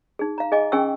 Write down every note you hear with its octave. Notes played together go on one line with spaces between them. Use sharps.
D#4 G#4
F5 A#5
G#4 D#5 G#5 D6
C#4 G#4 G5 G#5 C#6 E6